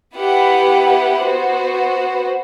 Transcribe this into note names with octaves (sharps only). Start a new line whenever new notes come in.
B3 E4 G4 B4 F#5
B3 F#4 C5